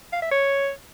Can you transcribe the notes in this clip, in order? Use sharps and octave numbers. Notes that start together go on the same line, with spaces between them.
F5
E5
C#5